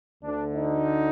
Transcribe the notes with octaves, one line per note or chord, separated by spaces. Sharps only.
D2 D3 D4
D#4